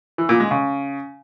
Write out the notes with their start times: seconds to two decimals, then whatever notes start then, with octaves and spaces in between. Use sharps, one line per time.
0.18 E3
0.29 A#2
0.40 G#3
0.51 C#3